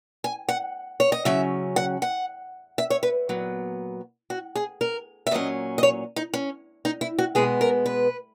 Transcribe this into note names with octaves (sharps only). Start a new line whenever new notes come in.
G#5
F#5
C#5
D#5
C#3 F#3 C#4 E5
F#5
F#5
E5
C#5
B4
A#2 F#3 B3
F#4
G#4
A#4
E5
A#2 F#3 C#4 D#5
D#5
C#5
D#4
C#4
D#4
E4
F#4
B2 G#3 B3 G#4
A#4
B4